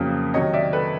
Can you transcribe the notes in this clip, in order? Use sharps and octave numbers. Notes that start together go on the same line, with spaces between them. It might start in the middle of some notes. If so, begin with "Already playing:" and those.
Already playing: F2 C#3 F#3 A#3
C3 D#3 F#3 C#5 D#5
D5 E5
A4 B4